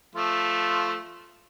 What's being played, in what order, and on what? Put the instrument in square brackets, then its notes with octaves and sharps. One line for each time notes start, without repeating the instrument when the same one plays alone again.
[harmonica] F3 A3 F4